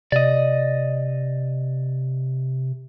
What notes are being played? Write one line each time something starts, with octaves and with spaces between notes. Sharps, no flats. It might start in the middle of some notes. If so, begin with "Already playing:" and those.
C3 D5 D#5